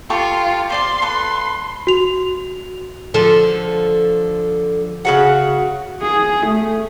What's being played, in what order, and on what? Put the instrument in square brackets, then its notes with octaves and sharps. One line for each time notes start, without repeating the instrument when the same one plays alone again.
[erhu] F4 [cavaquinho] G4 A4 C#6
[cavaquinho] C5 D5 F5 [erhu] C6
[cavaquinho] A4 B4
[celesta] F#4 F7
[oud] D3 F3 A4
[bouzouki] C#3 F#4 F#5
[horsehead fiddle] G#4
A3